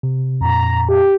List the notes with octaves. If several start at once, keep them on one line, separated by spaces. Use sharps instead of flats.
C3
F2 A#2 A#5
G4